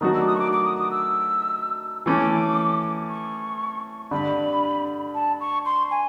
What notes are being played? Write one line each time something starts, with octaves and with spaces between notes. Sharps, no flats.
D#3 F#3 A3 D4 F#4 D#6
E6
D6
D#6
C#6
D6
D6
D#6
D#6
E6
E3 A3 C#4 D6
C#6
G2 D3 G3 B5
A5
C#6
C6
G#5